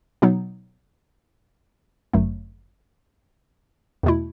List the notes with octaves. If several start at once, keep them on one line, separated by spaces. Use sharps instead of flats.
B2 F#3 B3 D#4
G1 F#2 F#3 A3
E2 B2 A3 E4